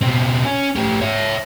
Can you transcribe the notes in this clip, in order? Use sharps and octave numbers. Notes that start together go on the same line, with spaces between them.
B2 C4
C#4
A2 G4
C#5 E5